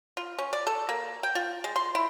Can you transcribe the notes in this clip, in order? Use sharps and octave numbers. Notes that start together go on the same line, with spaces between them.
F4
C#4
D5
A4
A#3
G5
F4
G#3
C6
E4